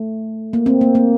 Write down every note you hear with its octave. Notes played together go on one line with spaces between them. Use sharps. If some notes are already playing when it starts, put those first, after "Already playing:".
Already playing: A3
A#3
C4
A#3
A#3